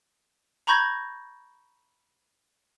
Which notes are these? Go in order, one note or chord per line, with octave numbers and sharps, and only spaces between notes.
A#5 B5 C#6 G6 G#6 A#6